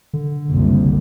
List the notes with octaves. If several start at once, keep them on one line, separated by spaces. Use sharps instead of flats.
D3
F#1 C2